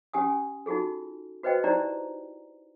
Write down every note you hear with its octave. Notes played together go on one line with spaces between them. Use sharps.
C#4 G4 G#5 D#6
D#4 F4 F#4 G#4 A4
F#4 B4 C5 D#5 G5
D#4 E4 G4 C5 D5 A#5